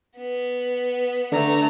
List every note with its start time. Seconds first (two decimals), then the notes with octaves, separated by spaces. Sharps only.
0.17 B3
1.32 D3 A3 A#5